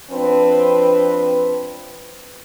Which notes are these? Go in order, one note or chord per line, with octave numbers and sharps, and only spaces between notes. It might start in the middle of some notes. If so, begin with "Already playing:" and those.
F3 C4 D4 B4